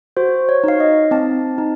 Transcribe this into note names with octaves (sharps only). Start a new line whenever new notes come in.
F#4 C5
C#5
D#4 F5
D#5
C4 A5
D#4